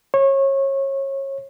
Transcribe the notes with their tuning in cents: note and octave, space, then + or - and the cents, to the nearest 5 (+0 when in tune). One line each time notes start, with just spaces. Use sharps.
C#5 -25